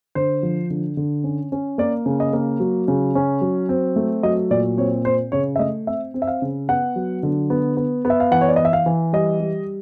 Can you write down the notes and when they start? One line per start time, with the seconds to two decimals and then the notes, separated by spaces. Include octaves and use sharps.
0.15 D3 C5
0.43 F3
0.70 D3
0.97 D3
1.24 C#4
1.52 C#4
1.78 A#3 D5
2.06 C#3
2.20 D#5
2.33 A#3
2.60 F#3
2.88 C#3
3.15 C#4
3.41 F#3
3.69 C4
3.96 A3
4.23 F#3 D#5
4.51 A#2 D5
4.78 C4 C#5
5.05 C4 C5
5.32 C#3 C#5
5.56 E5
5.59 A3 D#5
5.87 C4 E5
6.14 C4
6.22 E5
6.27 F5
6.42 C#3
6.69 B3 F#5
6.96 F#3
7.23 D3
7.50 B3
7.77 B3
8.05 B3
8.10 E5
8.20 F5
8.31 E3 F#5
8.41 C#5
8.48 D5
8.56 D#5
8.59 E3
8.65 E5
8.73 F5
8.86 E3
9.13 G3 D#5
9.40 G3